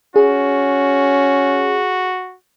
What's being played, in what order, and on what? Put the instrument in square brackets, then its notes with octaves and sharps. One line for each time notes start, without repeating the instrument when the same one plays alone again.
[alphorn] C#4 [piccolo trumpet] F#4 [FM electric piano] G#4